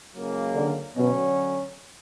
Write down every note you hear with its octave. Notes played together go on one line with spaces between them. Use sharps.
C#2 C#3 F#3 A#3
D3
B2 D3 F#3 C#4